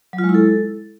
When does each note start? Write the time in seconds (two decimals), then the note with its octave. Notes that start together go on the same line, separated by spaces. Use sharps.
0.13 F#3
0.18 F4
0.24 G#3
0.29 E4
0.34 A4